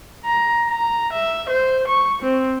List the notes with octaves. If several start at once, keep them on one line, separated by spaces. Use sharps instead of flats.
A#5
A#5
E5
C5
C#6
C4